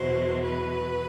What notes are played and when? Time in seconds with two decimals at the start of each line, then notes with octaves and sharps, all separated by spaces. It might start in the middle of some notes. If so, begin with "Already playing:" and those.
Already playing: E2 B2 F#3 C5
0.43 B4